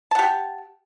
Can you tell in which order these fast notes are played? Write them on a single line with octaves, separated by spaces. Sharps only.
A5 F#5 G4